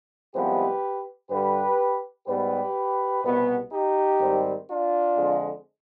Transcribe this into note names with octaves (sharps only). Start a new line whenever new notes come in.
C2 C3 F3 G#3 B3 G4 B4
G2 D3 G3 G4 B4
G#2 G3 B3 G4 B4
C2 B2 B3
D#4 G4
G#2 D#3 G3 C4
D4 F4
F2 D3 G#3